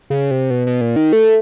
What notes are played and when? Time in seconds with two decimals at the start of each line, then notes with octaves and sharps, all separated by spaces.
0.10 C#3
0.31 C3
0.50 B2
0.67 B2
0.81 A#2
0.96 D#3
1.13 A3